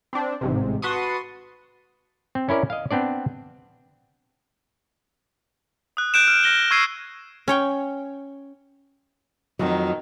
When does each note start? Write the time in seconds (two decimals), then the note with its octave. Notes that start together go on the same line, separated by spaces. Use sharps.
0.13 C4 D4
0.41 A1 G#2 C3
0.82 F#4 B4 A5 C6 C#6 D#6
2.35 C4
2.49 C#4 E4 A#4 D5
2.70 D#5 F5
2.91 B3 C4 D4 D5
5.97 D#6 F#6
6.14 F#6 G6 D7 E7
6.27 F6 E7
6.44 F6 A#6 G7
6.71 C#6 E6 G#6 C7 D#7
7.48 C#4 C#5 G5
9.59 F2 D#3 F3 F#3